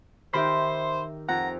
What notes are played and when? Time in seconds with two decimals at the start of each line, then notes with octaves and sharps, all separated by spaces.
0.34 D#3 G4 C5 E5 B5 C6
1.29 F2 F#5 A#5